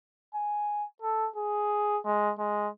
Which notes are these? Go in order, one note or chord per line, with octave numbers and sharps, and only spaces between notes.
G#5
A4
G#4
G#3
G#3